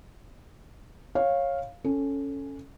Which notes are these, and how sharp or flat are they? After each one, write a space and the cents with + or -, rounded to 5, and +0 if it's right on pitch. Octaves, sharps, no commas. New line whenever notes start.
C#5 -15 F5 +0
C#4 +0 A4 +0